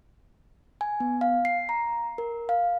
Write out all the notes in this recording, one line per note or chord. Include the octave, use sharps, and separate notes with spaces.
G#5
B3
F5
C7
A#5
A#4
F5